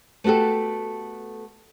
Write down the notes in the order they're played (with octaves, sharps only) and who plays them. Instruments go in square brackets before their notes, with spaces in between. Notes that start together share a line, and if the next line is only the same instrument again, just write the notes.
[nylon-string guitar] A3 B3 F#4 G4 A4